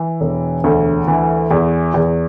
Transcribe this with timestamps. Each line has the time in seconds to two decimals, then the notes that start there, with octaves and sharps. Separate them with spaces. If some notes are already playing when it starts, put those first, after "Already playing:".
Already playing: E3
0.21 E1
0.64 D2
1.08 E3
1.51 E2
1.94 E2